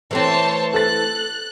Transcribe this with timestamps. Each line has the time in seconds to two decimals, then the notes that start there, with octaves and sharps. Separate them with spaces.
0.11 E3 A3 C4 C5 C#5 A5
0.73 A4 F#6 A6